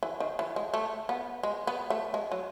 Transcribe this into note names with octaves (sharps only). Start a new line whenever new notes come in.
E3
D#3
E3
G#3
A3
B3
G#3
B3
A3
G#3
F#3